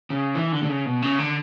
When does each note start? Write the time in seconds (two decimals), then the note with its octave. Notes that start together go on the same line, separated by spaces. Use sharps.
0.10 C#3
0.35 E3
0.52 D3
0.63 D3
0.69 C#3
0.86 B2
1.02 C#3
1.19 D3